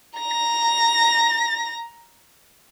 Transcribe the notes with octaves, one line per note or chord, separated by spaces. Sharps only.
A#5 A#6